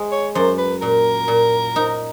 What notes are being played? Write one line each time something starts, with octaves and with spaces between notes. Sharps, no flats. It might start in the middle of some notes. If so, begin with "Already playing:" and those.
Already playing: G#3
C#5
F#2 C5
B4
A#2 A#4
A#2
D#4